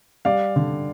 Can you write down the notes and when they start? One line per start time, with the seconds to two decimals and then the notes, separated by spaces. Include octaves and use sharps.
0.25 G3 D5 F5
0.56 D3